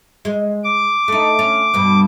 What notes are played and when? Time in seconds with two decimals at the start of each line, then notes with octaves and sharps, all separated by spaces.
0.25 G#3
0.64 D6
1.08 A3 D#4
1.39 C#4
1.74 G2 B2